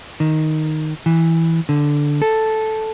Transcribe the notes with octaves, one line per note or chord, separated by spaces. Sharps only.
D#3
E3
D3
A4